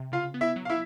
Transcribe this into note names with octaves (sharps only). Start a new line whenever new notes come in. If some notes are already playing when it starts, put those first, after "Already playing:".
Already playing: C3
C#3 F4 F5
B3
E4 E5
F#3
F5
E4 E5